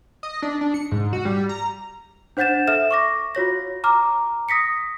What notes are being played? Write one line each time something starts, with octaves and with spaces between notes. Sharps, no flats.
D#5
D4
D4
C#7
G#2
F#4
G3
A#5
D4 C5 F#5 G6 A6 E7
A4 E5 F6 E7
C#6 D6 A#6
F4 F#4 C#5 A#6
A#5 D6 F6
D#6 A#6 B6 C#7